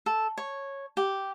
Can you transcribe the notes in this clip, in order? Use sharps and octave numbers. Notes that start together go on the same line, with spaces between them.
A4
C#5
G4